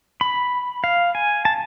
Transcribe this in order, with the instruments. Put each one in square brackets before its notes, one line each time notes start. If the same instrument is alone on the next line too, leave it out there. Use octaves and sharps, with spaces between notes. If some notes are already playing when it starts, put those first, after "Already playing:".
[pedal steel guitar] B5
F5
G#5
A5